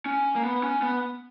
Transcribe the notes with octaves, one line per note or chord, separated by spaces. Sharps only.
C#4
A#3
B3
C#4
B3